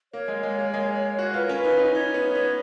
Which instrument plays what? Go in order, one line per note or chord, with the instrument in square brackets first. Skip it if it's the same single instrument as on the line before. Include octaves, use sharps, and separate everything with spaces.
[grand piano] A#3 [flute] C#5
[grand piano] G#3
G#3
A#3
G#3
F#4
[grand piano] F4 [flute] B4
[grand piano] C#4 [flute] A#4
[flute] B4
[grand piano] D#4
D#4
[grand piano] D#4 [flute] C#5
[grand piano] B3
B3